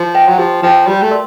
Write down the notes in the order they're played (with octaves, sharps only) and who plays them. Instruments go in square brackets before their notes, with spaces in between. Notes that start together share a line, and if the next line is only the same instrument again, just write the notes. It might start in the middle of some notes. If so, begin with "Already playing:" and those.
Already playing: [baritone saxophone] F3
[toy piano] B4 E5 G5
[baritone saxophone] F#3
[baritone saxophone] F3 [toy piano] G4
[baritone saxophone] F3 [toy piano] B4 E5 G5
[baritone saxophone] G3 [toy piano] F#4
[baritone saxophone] A3
[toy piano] A#4 D5 C6